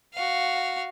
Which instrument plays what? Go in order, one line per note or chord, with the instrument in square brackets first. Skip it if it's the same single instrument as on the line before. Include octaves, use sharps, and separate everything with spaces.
[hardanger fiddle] F#4 F5